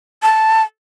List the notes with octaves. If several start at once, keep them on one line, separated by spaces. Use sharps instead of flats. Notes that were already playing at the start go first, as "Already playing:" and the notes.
A5